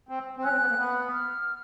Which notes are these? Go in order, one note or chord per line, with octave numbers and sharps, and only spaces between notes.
C4
C4
C#4 F#6
C4
B3
A#3
B3
F6